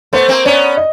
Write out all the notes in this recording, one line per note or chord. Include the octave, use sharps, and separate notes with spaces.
A3 B3 C5
A#3 C4
B3 C#4 D5
D#5